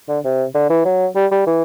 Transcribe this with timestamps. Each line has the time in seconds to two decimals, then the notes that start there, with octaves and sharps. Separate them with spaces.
0.09 D3
0.24 C3
0.55 D3
0.70 E3
0.85 F#3
1.16 G3
1.31 G3
1.47 E3